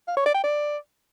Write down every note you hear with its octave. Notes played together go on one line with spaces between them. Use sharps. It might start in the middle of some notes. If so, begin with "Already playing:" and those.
F5
C#5
D5
G5
D5